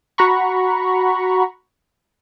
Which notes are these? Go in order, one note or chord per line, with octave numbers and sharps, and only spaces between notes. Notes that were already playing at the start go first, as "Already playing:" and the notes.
F#4 F#5 A#5 B5 C#6